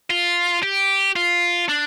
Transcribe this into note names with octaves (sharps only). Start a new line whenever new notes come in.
F4
G4
F4
D4